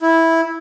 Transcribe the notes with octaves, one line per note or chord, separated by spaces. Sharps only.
E4